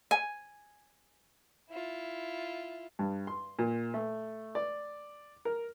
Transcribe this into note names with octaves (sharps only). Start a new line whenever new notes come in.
G#5
E4 F4
G2
C6
A#2
A3
D5
A#4